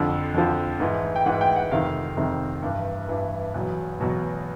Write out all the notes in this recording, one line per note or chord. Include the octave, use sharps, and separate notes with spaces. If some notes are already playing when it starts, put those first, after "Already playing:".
Already playing: F2 D3 F3
F2 D3 F3
G#2 E3
G5
G#2 E3 F#5
G5
F#5
F2 C3 D#3 F5
F2 C3 D#3
G2 E3
G2 E3
E2 B2 F#3
E2 B2 F#3